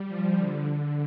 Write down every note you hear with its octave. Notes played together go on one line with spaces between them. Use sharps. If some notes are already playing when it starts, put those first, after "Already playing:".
Already playing: G3
F3
D3
D3